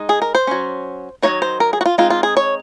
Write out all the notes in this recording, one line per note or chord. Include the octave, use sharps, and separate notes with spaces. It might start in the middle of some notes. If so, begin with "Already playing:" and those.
Already playing: G#3 D#4
G#4
A#4
C5
F#3 C#4
D#3 F#3 A#3 D#4 C#5
C5
A#4
G#4
F#4
F4
G#3 C4 D#4 F4
F4
G#4
C#5